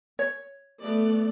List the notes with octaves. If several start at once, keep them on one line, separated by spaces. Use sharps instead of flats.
C#5
A3 B3 D5